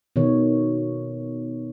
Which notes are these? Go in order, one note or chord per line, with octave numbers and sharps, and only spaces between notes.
B2 D#3 C#5